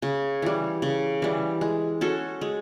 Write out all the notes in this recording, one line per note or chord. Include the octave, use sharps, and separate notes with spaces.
C#3
E3 G3
C#3
E3 G3
G#3
C#4 F#4 A4
G#3